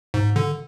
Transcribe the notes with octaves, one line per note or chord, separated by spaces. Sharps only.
G#2
D3